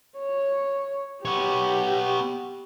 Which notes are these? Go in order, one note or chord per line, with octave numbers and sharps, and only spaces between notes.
C#5
B3 G4 C#5